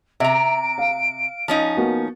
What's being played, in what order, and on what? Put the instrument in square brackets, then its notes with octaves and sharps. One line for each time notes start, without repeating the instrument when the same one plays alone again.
[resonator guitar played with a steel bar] C3 A#5 [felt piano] E5 [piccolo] D7
[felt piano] F5
[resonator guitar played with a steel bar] F3 C#4 D#4
[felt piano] A#3 B3 F#4